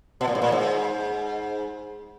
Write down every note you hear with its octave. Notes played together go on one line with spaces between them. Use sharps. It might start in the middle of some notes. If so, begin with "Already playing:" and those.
B2
A#2
G#2
A#2
G#2